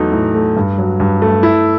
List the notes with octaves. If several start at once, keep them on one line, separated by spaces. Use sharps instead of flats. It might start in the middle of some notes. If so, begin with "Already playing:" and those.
Already playing: E2 F#3 A3 D#4
A2
A3
G2
F#3
G2
A3
E4